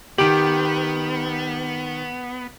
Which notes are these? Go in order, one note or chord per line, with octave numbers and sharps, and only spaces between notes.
D#3 B3 G4 D7 F#7